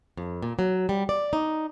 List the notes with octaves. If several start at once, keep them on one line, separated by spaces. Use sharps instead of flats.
F2
A#2
F#3
G3
D5
D#4